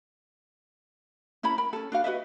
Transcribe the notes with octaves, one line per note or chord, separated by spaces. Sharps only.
C#4 E4 A#4 B5
A#4 B5
C#4 A4
D4 F#4 F5
F#4 B4 D#5 E5